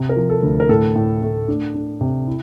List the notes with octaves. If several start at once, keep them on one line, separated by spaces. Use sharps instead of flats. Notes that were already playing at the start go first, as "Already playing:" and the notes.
Already playing: C3
A#4
F3
A4
D2
A#4
A2 A4
A2
A3
D4
D4
C3
E4